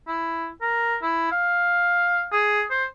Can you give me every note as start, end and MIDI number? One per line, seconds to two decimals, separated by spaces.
0.07 0.48 64
0.61 0.96 70
1.02 1.28 64
1.31 2.26 77
2.32 2.62 68
2.70 2.84 72